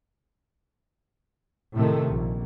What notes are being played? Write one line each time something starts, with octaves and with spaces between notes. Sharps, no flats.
A2 C3 D#3 A3
A#1